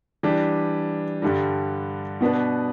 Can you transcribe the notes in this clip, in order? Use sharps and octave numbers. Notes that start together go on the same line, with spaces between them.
E3 G3 D4 G4
G2 D3 G3
B2 B3 D4 B4